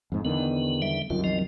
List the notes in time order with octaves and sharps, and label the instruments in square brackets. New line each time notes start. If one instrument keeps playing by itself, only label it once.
[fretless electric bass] F2 G#2
[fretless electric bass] E2 D3 D#3 [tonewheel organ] B3
[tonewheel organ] G3 E5
[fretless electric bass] C2 F#2 D#3 [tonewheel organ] F4
[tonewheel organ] F3 D#5